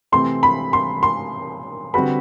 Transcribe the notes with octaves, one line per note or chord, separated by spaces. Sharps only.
C3 E3 A3 C4 C6
B5
C6
C6
D3 G3 C4 F#4 B4 B5